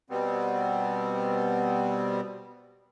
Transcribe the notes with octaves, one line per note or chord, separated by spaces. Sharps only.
B2 G3 B3 C4